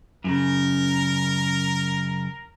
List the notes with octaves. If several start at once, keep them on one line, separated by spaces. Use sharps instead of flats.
F#2 A2 C#3 A#4